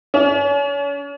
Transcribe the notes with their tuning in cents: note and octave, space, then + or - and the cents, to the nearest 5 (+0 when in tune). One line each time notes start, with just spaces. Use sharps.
C#4 +40